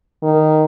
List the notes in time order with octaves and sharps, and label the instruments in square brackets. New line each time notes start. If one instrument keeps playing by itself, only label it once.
[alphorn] D#3